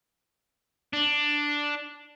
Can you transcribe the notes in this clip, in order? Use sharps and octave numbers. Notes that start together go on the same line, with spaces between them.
D4